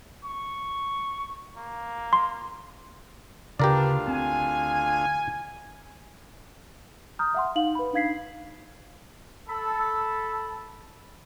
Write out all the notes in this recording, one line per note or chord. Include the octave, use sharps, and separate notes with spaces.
C#6
A#3
C6
D2 C#3 D4 F4 G4 A#4 B4 D5
C4 G#5
A#5 D#6 F6 G6
E5 F#5 C6
D#4 F5 F#7
B4 B5
D4 D#4 F5 G#6 B6 C7
A4 B5 E6